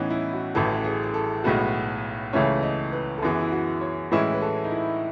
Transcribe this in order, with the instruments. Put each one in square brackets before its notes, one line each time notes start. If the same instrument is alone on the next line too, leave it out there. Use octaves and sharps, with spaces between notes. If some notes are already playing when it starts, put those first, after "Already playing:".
Already playing: [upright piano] A2 E3 B3 [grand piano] C#4 D#4
[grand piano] E4
F#4
[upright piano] A1 A2 E3 [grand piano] A4
[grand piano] G#4
G#4
A4
[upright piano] B1 A2 G#3 B3 F#4
[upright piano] C#2 C#3 E3 A3 C#4 [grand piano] C#5
[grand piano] D#5
B4
A4
[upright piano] F#2 E3 B3 [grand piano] G#4
[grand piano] E4
F#4
C#5
[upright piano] A2 E3 G#3 C#4 E4 [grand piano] B4
[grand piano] B4
A4
D#4
E4